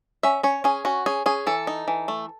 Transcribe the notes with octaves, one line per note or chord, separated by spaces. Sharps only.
C#4 E5
C#4 C#5
C#4 G#4
C#4 F#4
C#4 G#4
C#4 G#4
E3 A4
D#4
E3
A3